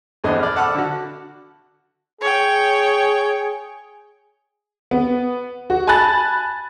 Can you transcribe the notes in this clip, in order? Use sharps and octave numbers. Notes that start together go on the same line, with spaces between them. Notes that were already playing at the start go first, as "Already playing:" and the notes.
A#1 E2 C4 D4 G#4 D#5
D5 F6
A4 F#5 A5 B5 D6 F6
D3 F#4
G#4 C#5 G5
B3
F#4
G#5 A5 B5 F#6 A6